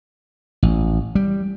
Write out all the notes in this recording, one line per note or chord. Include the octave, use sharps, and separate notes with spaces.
A1
G3